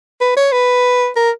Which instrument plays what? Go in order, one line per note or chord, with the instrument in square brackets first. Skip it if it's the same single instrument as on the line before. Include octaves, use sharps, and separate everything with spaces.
[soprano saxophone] B4
C#5
B4
A#4